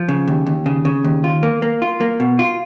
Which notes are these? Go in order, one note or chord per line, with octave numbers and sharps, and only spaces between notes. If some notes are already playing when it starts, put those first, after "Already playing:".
Already playing: F3
C#3
D#2
D#2
C#3
C#3
D#2
F4
A#3
A#3
F4
A#3
B2
F4